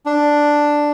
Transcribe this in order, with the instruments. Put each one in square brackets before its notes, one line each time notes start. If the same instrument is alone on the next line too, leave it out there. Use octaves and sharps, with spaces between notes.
[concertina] D4